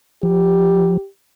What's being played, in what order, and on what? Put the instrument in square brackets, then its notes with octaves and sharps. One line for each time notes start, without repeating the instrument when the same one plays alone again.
[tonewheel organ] F3 [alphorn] G4